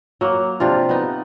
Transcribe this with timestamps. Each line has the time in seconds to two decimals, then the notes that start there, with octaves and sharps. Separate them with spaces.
0.21 F#3 A#3
0.60 C3 D4 F4
0.89 B3 D#4